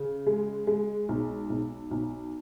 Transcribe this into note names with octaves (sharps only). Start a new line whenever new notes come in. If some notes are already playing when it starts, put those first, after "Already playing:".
Already playing: C#3
G#3
G#3
B1
B1
B1